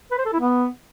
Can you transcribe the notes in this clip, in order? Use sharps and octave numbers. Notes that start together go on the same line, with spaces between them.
B4
C5
A4
E4
B3